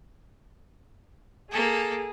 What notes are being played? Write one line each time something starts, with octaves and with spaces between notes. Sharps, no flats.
A#3 G#4 A4